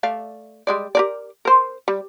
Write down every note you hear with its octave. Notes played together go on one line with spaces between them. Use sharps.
A3 D5 F5
G3 G#3 D5
G4 A#4 D5
A#4 C5
G3